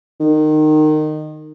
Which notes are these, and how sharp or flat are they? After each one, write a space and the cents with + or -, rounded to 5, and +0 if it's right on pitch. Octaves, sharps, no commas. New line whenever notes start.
D#3 -20